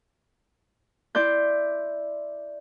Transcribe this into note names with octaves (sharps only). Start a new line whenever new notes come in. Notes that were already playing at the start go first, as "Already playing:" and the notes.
E4 D5 C6 G6